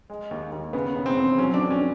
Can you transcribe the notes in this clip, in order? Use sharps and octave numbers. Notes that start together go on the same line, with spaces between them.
G#3
D#2
D#2
C#3 B3
E1
C4
E3
F#3 C#4
D4
F2
C#4